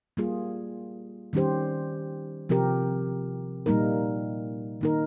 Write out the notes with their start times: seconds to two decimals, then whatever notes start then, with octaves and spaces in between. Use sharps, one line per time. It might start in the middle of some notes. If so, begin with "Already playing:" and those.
0.17 G3 A#3 F4 G#4
1.33 D#3 G3 C#4 G4 C5
2.49 C3 F3 C4 G4 A#4
3.66 A#2 G3 A#3 D#4 A#4
4.81 D#3 A#3 D#4 A#4